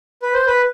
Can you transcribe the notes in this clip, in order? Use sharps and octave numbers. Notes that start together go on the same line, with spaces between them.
B4
C5
B4